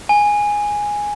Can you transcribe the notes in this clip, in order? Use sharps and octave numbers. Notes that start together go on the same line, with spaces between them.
G#5